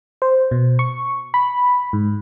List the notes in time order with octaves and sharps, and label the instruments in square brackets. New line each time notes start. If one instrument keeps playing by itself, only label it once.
[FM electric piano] C5
B2
C#6
B5
G#2